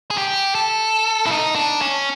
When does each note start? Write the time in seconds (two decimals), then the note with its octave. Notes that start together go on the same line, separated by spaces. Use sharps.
0.11 G#4
0.18 G4
0.55 A4
1.26 E4
1.31 D#4
1.55 D4
1.81 C#4